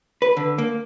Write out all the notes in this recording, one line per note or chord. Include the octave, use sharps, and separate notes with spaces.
B4
D3
A#3